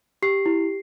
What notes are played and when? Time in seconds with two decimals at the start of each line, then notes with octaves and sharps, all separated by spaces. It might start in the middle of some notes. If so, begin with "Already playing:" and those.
0.22 G4 C7
0.46 E4